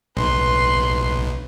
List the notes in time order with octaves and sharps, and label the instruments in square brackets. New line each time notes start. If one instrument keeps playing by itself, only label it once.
[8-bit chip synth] B1 [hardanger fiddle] B4 C6